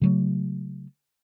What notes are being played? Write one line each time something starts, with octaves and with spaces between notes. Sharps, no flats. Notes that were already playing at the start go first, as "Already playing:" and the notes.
C#3 F#3 A3